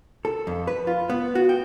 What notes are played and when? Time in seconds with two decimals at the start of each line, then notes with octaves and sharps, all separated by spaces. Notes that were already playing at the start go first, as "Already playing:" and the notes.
0.25 A4
0.47 F2
0.67 B4
0.87 F4
1.10 B3
1.35 F#4
1.49 G5